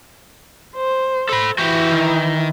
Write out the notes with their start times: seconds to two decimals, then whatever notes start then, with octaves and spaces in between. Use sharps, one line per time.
0.76 C5
1.29 A4 B5
1.58 E3 E4 F#4 G4
1.92 D#3